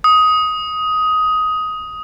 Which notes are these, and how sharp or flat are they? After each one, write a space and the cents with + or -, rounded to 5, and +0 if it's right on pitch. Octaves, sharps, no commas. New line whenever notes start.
D#6 +15